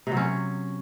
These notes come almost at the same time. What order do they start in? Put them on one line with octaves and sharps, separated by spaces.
C3 F#3 C#4